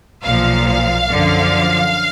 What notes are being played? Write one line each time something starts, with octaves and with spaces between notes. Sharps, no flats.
B1 A#2 F3 F5
F#2 D3 F3